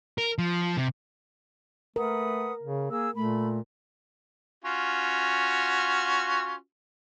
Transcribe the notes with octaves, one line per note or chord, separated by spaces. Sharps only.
A#4
F3
C3
A3 A#4 B4 F#5 D#6
C#3
A#3 G#4 E6
A#2 A3 B5
C#4 F4 F#4